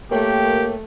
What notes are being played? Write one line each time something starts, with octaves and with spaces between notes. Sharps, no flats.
A3 A#3 G4 A#4 C#5 G5